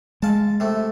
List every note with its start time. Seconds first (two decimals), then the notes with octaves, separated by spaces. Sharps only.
0.22 G#3 F5 A5
0.60 C3 A3